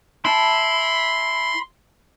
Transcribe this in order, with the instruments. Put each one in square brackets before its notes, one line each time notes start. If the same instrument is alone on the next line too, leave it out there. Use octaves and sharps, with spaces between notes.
[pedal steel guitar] E4 A5 [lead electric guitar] B5 [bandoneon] C6